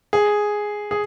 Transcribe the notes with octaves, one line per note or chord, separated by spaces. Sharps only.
G#4
G#4